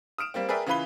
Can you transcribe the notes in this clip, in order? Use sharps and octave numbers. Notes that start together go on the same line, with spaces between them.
D#6 F6 D7 E7
G3 A#3 C4
G#4 A#4 B4 D5 E5 G5
C#3 E3 F4 B4 B5 G7